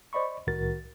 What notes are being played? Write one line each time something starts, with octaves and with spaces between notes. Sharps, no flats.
C5 D5 D#5 B5 C#6
C2 A2 D#3 F#4 A#4 A6